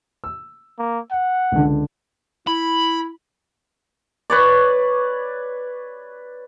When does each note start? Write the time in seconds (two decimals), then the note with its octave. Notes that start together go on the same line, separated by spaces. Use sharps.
0.24 E6
0.79 A#3
1.11 F#5
1.52 C#2 D3
2.47 E4 B5
4.30 B4 C#5 D5